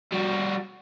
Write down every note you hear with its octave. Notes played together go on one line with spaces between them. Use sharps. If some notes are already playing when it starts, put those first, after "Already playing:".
G3 F#4